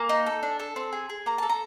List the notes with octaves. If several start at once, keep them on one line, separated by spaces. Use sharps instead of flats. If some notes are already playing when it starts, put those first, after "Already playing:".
Already playing: A#3 G#5
D#4
A4
D4
A4
C4
G#4
G#4
A#3 A#5
A4 A5
A#5